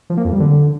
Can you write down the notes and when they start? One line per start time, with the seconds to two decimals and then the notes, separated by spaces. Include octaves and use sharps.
0.10 F3
0.17 A#3
0.25 F2
0.32 G3
0.40 D3